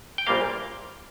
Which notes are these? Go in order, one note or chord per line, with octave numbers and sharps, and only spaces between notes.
G5
A#1 A#2 G3 A#3 F5